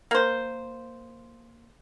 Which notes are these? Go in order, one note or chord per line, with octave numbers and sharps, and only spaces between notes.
A#3 C5